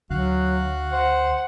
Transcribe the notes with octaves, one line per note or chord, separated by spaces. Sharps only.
D2 F#3 F#4 F5 F#6
C5 F#5